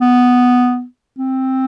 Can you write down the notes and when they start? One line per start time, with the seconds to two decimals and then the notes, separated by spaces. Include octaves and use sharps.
0.01 B3
1.18 C4